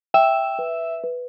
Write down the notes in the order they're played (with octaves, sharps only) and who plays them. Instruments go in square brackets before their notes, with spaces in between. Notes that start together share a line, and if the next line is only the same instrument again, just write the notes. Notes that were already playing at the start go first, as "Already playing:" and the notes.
[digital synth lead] E5 [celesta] G5
[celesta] B4
B4